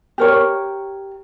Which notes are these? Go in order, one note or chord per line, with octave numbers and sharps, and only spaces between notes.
G4 A#4 C#5